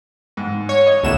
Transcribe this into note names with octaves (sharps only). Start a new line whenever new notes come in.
G#2
C#5
D#5
C#2 B2 D3 A3 E7